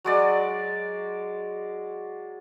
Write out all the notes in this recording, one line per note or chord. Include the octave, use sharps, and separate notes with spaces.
F#3 G#3 D5